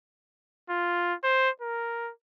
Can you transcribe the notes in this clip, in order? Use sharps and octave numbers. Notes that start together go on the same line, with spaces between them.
F4
C5
A#4